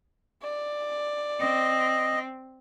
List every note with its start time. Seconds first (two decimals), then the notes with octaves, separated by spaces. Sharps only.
0.43 D5
1.41 C4 D#5